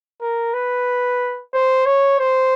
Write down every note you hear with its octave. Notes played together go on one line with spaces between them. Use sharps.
A#4
B4
C5
C#5
C5